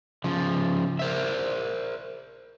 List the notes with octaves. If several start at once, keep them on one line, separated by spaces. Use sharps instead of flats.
C#3 F3
A#4 C5 E5